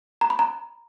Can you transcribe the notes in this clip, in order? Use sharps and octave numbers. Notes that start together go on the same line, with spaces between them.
A#5
B5
A#5